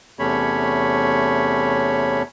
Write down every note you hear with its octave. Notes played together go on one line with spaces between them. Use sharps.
E2 C3 A3 C#4 C#5 B5